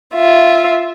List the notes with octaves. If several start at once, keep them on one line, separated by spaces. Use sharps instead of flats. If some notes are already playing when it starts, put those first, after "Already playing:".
F4 E5